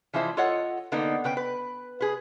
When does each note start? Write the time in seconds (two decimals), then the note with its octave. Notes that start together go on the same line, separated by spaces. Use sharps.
0.13 E3 F3 G#3 E4 C5
0.37 F4 A4 C#5 D#5 F#5
0.92 D3 A#3 B3 D#4 A4
1.24 C#3 B4 G5
1.37 B4
2.01 G#4 B4